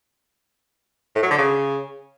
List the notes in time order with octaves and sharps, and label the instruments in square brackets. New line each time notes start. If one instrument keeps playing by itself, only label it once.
[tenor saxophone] A2
F#3
D3
C#3